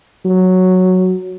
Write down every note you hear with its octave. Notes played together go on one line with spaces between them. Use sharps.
F#3